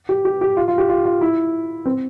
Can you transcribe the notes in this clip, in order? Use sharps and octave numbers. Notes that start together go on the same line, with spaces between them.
G4
G4
G4
F4
F4
G4
F4
F4
E4
C4